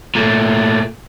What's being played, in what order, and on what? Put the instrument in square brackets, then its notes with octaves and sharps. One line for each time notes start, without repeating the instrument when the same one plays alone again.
[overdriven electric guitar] A#2 A3